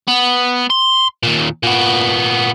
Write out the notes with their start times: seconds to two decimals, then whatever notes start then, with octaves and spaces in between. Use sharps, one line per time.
0.08 B3
0.70 C6
1.23 D#2 A#2
1.63 A#2 B3